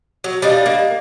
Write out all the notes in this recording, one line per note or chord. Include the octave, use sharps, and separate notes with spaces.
F#3
G3 D4 D#5 F5
A#3